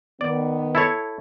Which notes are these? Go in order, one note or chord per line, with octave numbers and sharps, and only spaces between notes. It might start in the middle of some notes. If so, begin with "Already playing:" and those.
D#3 B3 D5
E4 A4 C#5